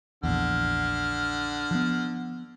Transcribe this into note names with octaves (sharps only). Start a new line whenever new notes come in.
A#1 E2 D3 F6
F3 B3